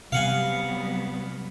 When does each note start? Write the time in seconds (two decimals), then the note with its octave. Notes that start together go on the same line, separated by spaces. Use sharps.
0.12 C3 F#3 G3 B3 F5 F#5 G#5